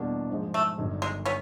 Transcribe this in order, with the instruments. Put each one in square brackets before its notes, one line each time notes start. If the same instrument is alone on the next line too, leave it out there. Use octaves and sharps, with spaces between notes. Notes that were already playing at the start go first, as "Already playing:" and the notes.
Already playing: [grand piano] E2 B2 G3 A#3 D4
G#2 F3 G#3
[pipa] A3
[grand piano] G1 G2 D#3 F#3
[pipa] G#3
B3 C#4